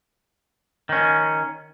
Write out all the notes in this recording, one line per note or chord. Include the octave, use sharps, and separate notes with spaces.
D#3 C#4